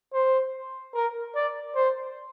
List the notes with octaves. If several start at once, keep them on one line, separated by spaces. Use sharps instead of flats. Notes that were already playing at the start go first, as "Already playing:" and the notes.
C5
A#4
D5
C5